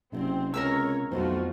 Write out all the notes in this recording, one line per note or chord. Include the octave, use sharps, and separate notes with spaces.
F#1 C3 C4
C#2 A#4 C#5 A#5 E6
B1 F2 D#3 A3 F4 F#4 C5